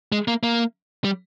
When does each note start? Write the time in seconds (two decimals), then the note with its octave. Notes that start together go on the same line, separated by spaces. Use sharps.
0.12 G#3
0.28 A#3
0.43 A#3
1.04 G3